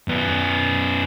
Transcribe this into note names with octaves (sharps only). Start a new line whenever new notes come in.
F#2 B3